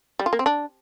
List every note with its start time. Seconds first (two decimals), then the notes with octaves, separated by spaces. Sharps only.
0.19 G3
0.26 F4
0.33 A#3
0.39 C4
0.46 D4